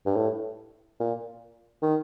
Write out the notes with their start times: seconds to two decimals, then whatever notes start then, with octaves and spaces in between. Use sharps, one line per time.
0.06 G2
0.16 A2
1.00 A#2
1.82 D#3